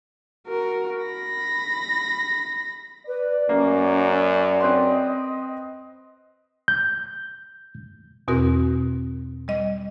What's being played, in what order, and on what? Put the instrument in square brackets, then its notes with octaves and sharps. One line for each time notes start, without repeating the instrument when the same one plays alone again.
[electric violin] F#4 A#4
B5 A#6
[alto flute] B4 [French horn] D5
[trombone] F#2 [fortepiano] A#3 [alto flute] C#4
[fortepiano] C4 B4 C6 [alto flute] D#5
[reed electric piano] G6
[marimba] E2 B2 C4 F#4 A#4
G3 D#5